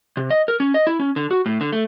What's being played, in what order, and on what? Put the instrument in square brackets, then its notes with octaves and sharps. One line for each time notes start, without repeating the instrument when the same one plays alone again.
[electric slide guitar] C3
D#5
A#4
C#4
D#5
E4
C#4
D3
F#4
A2
D3
A3